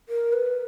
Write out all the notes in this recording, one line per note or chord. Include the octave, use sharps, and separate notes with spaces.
A#4
B4